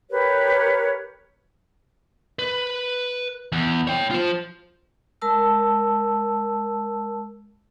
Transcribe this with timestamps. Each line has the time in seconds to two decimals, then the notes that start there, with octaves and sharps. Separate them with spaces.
0.10 G4 A#4 B4 C#5
2.39 B4
3.52 E2
3.87 C#5 G5
4.11 F4 C5
5.22 G#3 A#4 A5 E6